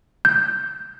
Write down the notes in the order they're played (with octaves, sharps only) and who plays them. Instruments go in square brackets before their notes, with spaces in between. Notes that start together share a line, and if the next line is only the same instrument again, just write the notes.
[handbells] G6